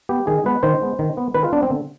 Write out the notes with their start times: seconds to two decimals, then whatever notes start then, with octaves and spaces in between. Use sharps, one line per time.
0.09 B3 G4
0.27 D#3 G#4
0.45 G#3 B3 B4
0.63 D#3 C5
0.82 G#3 B3
0.99 D#3
1.17 B3
1.34 D#3 B4
1.44 F4
1.53 B3 D4
1.63 C4
1.70 D3